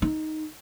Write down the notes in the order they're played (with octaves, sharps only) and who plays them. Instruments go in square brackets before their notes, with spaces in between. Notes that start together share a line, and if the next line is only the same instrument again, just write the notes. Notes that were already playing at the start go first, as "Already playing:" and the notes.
[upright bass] D#4